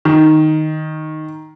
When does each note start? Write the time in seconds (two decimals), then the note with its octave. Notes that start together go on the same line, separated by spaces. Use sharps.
0.05 D#3